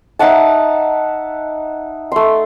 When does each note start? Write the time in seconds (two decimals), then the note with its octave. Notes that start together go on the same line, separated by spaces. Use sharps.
0.19 D#4 E5 F#5 A5
2.12 A3 C6